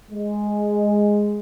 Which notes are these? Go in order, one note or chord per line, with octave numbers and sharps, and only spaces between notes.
G#3